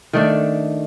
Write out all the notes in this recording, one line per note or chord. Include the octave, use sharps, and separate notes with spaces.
D#3 A3 D4